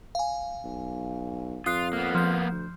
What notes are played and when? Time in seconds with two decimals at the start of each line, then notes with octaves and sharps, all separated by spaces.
0.15 F5 G#5
0.64 B1
1.66 F2 F4 D#6 F#6 C7
1.93 A#3 B3
2.15 F3 G6
2.51 D2